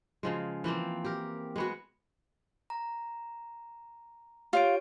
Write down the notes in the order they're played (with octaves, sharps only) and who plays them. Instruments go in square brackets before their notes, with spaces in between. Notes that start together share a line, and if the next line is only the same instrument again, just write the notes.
[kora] C#3 F3 G#3
E3 F3 A#3 C4
G4 A#4
G#3 B3 F#4
[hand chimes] A#5
[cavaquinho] F4 [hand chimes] G4 C#5 D7